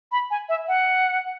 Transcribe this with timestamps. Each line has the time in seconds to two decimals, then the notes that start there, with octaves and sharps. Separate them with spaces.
0.12 B5
0.31 G#5
0.49 E5
0.68 F#5